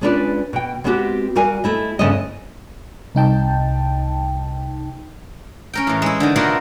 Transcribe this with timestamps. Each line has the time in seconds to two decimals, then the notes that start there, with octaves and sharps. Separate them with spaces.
0.01 G#3 C#4 D4 F4 B4 D5
0.53 B2 G5
0.84 G#3 B3 C4 D#4 F#4 G4
1.35 G3 F#4 A#4 F5 G#5
1.64 A3 E4 D#5
1.99 G2 C#3 A3 C4 E4 D#5
3.15 C2 D#4 G5 A5
5.74 C#4 A#4 G5
5.87 A2 E3
6.02 G#3 E4
6.20 D3 D#3
6.36 B2 D3 D#3 A#3 E4 F4